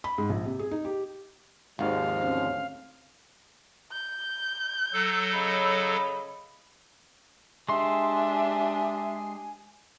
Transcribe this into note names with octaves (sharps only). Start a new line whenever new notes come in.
B5
G#2
A#1
C3
G#4
D#4
G4
G#1 D#2 G#2 F3 G#3 F5
D2 C4 C#4
G6
F#3 A4
C#3 D#5 B5
G#3 D4 G4 E5 G#5 C6